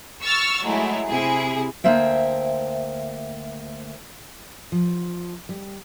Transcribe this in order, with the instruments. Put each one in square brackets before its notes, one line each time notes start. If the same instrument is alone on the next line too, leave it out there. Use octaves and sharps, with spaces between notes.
[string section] C#6 E6 F6 A6
F#3 G#3 A3 E4
C3 E4 G#4
[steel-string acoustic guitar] D2 A#3 C5 E5 G5
F3
G3